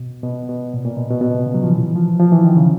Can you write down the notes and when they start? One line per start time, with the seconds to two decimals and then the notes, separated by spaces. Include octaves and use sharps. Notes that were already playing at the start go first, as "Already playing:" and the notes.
Already playing: B2
0.23 B2
0.49 B2
0.74 A#2
0.85 A#2
0.97 B2
1.10 B2
1.21 B2
1.34 C3
1.46 C#3
1.54 F#3
1.63 F3
1.71 E3
1.95 F3
2.20 F3
2.32 E3
2.44 D#3
2.57 C#3